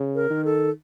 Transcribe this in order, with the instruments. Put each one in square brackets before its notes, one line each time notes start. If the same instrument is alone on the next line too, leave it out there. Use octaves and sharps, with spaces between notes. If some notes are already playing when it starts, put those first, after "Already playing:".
Already playing: [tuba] C#3
[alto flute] A#4
[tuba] D#3
[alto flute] A4